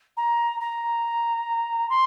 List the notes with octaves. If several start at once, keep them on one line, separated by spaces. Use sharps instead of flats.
A#5
A#5
C6